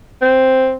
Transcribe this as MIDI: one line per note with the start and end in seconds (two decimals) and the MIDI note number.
0.22 0.77 60